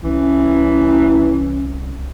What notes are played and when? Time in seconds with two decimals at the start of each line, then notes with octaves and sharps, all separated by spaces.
0.03 C2 E3 C#4